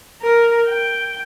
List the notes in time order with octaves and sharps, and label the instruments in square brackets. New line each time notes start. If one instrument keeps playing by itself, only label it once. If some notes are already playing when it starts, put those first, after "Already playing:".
[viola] A#4
G5